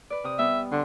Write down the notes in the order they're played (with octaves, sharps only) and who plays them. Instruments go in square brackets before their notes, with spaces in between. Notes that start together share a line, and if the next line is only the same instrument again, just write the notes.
[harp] B4 D5
C3 D#6
[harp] G3 B3 [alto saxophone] E5
[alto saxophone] D3 [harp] C6